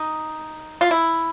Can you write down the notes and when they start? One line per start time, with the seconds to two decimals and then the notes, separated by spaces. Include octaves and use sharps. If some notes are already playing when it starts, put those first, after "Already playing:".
Already playing: D#4
0.81 F4
0.91 E4